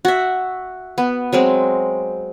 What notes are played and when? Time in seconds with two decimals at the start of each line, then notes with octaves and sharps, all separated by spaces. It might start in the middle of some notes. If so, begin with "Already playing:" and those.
0.05 F#4 E5
0.98 B3
1.33 F#3 G#3 C4